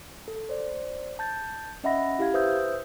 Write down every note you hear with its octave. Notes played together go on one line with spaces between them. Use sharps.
A4
C5 D5
A5 G6 A6
C#4 D#5 E5 F#5 B5 A#6
E4 G4 F5 G#6
B4 C5 E5 D#6 E6 G6